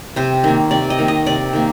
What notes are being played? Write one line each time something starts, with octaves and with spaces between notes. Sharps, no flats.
C3 C5
D#3 A#3
C3 D5
D#5
D#3 A#3
D#5
C3 D5
D#3 A#3